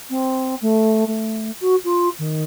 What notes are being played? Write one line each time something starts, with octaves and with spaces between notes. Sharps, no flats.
C4
A3
A3
F#4
F4
D#3